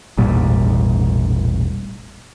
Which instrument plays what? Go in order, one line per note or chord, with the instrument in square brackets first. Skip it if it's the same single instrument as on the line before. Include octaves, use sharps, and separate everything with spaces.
[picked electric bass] E1 A1 A#2 G3